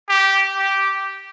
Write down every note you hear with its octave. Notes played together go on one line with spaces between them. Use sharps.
G4
G4